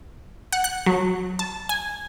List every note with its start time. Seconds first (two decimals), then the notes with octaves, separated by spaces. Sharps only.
0.52 F#5
0.64 F#6
0.86 F#3
1.39 A5
1.69 G#5